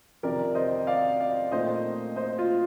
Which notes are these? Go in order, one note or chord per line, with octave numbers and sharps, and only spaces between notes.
F2 C3 D#3 A#4 D5
C5 D#5
D5 F5
D5 F5
A#2 A3 C4 D#4 C5 D#5
C5 D#5
F4